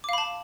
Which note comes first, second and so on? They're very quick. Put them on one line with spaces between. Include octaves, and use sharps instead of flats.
D6 F5 B5 A5